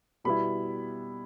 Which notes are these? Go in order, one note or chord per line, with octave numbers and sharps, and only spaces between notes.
B2 G3 B3 E4 B5